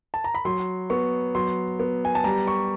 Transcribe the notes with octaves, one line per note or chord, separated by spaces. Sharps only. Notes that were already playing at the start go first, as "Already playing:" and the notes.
A5
A#5
B5
F#3 C6
B3 C#6
F#3 C6
B3
G#5
A5
G3 A#5
C#6